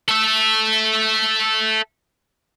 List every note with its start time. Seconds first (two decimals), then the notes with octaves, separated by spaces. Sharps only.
0.08 A4 E5